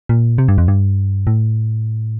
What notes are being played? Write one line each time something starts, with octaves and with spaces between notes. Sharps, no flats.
A#2
C3
G2
F2
G2
A2